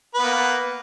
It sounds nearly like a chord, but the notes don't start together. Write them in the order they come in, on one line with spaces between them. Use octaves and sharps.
B4 B3 A#3